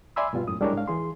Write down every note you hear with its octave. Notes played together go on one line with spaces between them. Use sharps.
D5 E5 G#5 B5 C6 E6
G2 B2 G3 F4
F#2 A2 D#6
G3 G#3 D4 E4 A#4 C#5
G#2 F5
E3 G#4 C6